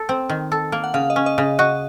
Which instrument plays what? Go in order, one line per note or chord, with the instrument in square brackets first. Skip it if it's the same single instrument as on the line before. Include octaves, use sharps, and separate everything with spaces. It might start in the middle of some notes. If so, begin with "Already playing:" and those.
Already playing: [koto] A4
C4
D#3
A4
A#3
[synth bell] F#5
[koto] C#3 [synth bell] F5
[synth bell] D#5
[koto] C#4
[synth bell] D#5
[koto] C#3
[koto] F#4 [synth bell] D#5